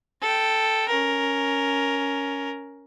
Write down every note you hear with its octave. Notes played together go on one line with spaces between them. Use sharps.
A4 G5
C#4 A#4